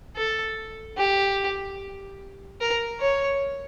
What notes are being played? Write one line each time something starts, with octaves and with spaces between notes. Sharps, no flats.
A4
G4
A#4
C#5